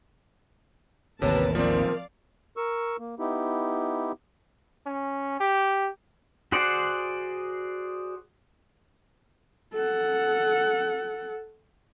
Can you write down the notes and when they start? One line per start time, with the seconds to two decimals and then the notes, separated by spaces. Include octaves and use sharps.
1.22 A1 D#2 C3 A#4 B4 C#5 A5
1.55 F3 C4 A#4 D5 F5
2.57 A#4 C#6 E6
2.99 A#3
3.19 B3 D#4 E4 G4
4.86 C#4
5.40 G4
6.52 F#4 G#4 C5 D5 F#5
9.73 A4 F#5